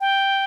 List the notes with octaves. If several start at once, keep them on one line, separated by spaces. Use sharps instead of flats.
G5